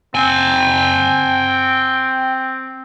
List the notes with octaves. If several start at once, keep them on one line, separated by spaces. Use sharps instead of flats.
C4 G5 G#5